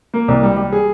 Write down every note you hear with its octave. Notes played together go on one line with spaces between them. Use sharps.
A#3
C2
G3
G3
G#4